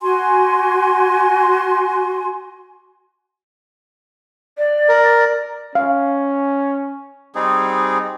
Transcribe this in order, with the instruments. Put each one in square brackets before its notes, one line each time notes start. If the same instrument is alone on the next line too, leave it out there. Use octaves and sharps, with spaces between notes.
[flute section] F#4 G#5 C6
[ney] D5
[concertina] A#4
[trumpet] C#4 [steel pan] F5
[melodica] G3 C4 D#4 G#4